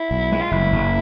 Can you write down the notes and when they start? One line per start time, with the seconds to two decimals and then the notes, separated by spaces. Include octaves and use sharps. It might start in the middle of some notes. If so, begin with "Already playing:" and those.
Already playing: E4
0.11 B1
0.32 G#3
0.41 F4
0.51 F#1 E4
0.72 F#1